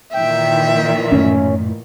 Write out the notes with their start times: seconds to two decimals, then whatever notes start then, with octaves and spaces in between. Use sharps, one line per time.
0.13 A#2 D#3 E3 E5 G5
1.11 F#2 A2 C#4